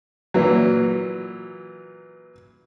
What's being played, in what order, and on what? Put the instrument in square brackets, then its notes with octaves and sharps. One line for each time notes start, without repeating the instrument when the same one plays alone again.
[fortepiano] A#2 E3 F#3